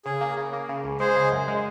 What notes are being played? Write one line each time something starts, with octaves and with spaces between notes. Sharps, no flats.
C#3 G#4
A#3
C#3
A#3
C#3
C#2
G#3 G#4 C5
C#3
F#2
G#3